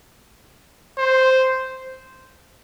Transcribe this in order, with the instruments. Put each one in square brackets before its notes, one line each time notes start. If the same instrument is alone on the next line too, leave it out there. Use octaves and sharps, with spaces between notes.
[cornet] C5